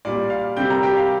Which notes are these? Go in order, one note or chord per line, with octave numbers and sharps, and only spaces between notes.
A#2 G3 D5
F5
C3 G3 G5 G6
A#4 A#5
G4 G5
F5